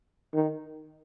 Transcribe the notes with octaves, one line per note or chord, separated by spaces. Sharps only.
D#3